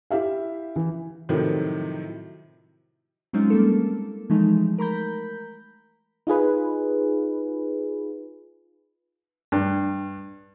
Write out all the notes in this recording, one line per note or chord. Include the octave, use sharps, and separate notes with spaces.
E4 G4 E5 F5
E3
A2 C3 D#3 F3 F#3
F#3 G#3 C4 C#4 D#4 F4
G3 A#3 A4
E3 F3 G#3 A3 D#4
A#4 A#5 B5 G6
D#4 F4 G#4 B4
G2